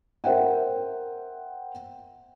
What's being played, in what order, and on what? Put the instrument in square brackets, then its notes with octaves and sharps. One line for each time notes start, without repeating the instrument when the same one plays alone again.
[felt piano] A#4 C5 E5 F#5 G5